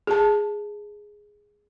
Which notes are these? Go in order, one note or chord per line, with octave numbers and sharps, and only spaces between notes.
G#4 A5